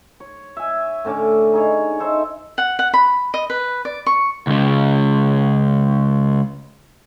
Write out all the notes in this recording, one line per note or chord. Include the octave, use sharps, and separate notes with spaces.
C#5
E5 G#5
A2 D3 C#4 D6
D#4 G#4 C#5
D#4 A4 C5 E5
F#5
F#5
B5
D#5
B4
D5
C#6
C#2 C#3